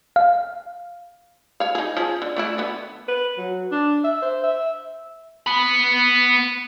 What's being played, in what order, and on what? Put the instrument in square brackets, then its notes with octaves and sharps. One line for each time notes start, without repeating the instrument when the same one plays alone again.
[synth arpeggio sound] F5
[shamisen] C#5 F5
D#4 G#4
F3 C#4 G#4
D3
A3 D4 E4
D3 B3
[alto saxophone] B4
F#3
D4
E5
C5
E5
[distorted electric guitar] B3 B5